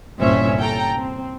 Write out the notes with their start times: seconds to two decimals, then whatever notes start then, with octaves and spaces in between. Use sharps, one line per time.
0.20 G1 C2 A#2 C#4 C5 E5
0.58 A4 G5 A#5
0.97 C4